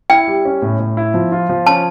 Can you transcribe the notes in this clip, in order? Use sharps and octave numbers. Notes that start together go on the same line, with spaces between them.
E4 G5
G3
C#4
A2
A2
E4
F3
F4
F3
C#4 A5